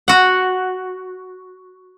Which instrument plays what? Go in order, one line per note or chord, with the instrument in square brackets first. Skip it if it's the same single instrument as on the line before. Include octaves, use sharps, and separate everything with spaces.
[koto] F#4 F#5